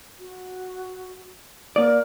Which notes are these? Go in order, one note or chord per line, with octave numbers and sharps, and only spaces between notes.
F#4
A#3 D5